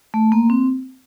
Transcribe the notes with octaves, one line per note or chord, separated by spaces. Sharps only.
A3
A#3
C4